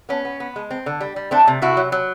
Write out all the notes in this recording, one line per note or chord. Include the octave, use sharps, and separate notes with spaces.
B3 C#4
B3
B3
G#3
C4
D3
G3
G3
A3 C4 D4
C3
C3 E4 F#4
F#3
F#3